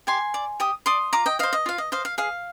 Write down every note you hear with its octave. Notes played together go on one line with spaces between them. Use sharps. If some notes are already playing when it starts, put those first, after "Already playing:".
G4 G#5 C6
D5
G4 D#6
D5 C6 D#6
F4 A#5 D6
D#5 G5
C5 D#5 F5
D#5
F4 F5
D#5
C5 D#5 F5
F5
G#4 F5